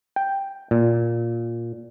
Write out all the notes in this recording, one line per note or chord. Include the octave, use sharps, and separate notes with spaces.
G5
A#2